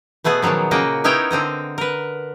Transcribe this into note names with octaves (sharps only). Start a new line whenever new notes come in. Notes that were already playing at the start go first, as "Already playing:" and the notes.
B2 A3 B3 G#4 F#5
A#2 D#3 F3 F#3 B3
C#3 A#3 F#4 D#5 G5
B3 D#4 E4 A#4 C#5 G5
D3 C4 D#5 A#5
A#4 B4